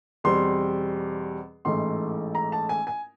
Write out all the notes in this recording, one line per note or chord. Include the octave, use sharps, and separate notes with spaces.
E2 B2 G3 C4 C6
A1 G#2 E3 A3 C6
A#5
A5
G#5
G#5